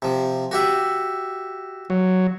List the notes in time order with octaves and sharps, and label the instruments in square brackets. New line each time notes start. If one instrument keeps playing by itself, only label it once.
[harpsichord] C3 F3
F#4 G4 E5
[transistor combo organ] F#3